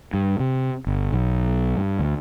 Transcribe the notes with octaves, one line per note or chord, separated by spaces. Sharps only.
G2
C3
G1
B1
G2
D2